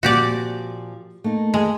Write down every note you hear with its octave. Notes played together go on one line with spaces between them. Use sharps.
A#2 F3 C4 F#4 G4 D5
A3 A#3 D#4
G#3